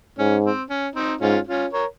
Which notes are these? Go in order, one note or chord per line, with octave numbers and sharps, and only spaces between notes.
G#2 C#4
C4
C#4
C4 D#4
G#2 C#4 F4
C#4 F4
A#4 C#5